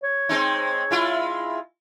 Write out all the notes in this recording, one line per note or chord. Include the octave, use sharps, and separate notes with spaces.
C#5
G#3 C4 D#4
G#3 E4 F4